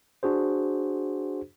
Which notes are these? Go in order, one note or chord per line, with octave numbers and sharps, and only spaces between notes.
D4 F#4 G#4 C5